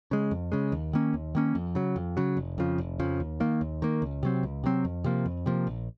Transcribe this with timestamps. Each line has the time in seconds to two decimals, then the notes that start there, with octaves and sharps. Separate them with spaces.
0.11 C#3 G#3
0.31 F2
0.52 C#3 G#3
0.72 D#2
0.93 D#3 A#3 C#4
1.14 D#2
1.35 D#3 A#3 C#4
1.55 F2
1.75 C#3 F#3
1.96 F2
2.17 C#3 F#3
2.37 F1
2.58 F2 C#3 F3
2.78 F1
2.99 F2 C#3 F3
3.20 D#2
3.40 D#3 A#3
3.61 D#2
3.82 D#3 A#3
4.02 C#2
4.23 C3 F#3 C4
4.43 C#2
4.64 C3 F#3 C4
4.85 F2
5.04 C3 F3 A#3
5.25 F2
5.46 C3 F3 A#3
5.67 A#1